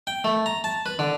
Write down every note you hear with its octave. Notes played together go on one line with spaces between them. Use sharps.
G5
A3
A#5
A5
B4
D3